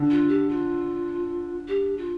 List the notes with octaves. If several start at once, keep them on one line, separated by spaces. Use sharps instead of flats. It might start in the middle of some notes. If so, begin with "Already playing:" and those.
Already playing: D3
F4
G4
F4
G4
F4